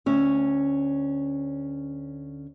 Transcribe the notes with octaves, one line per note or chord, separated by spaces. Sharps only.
D2 C#4 E5